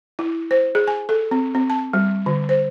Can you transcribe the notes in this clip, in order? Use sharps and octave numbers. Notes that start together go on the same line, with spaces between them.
E4
C5
G#4
G#5
A4
C4
C4
A5
G3
D3
C5